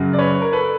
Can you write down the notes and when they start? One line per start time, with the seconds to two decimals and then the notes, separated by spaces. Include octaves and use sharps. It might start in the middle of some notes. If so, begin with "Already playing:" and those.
Already playing: F#2 C#3 F#3
0.13 D5
0.19 B4 C#5
0.41 A#4
0.52 A4 B4